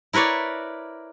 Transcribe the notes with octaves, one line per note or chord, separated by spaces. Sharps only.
E4 A#4 B4 C#5 D5